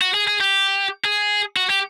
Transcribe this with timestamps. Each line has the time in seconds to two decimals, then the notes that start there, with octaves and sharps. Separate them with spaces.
0.01 F#4
0.14 G#4
0.28 G#4
0.41 G4
1.04 G#4
1.57 F#4
1.69 G4